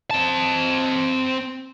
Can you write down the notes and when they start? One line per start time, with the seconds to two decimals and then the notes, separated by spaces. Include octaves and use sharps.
0.11 C4 A5